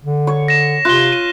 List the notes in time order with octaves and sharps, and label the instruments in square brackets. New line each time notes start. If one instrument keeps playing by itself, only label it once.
[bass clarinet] D3
[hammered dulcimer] C#5
[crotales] A#6 E7
[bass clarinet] C3 [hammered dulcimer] F4 [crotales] F#6 G7
[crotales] D#7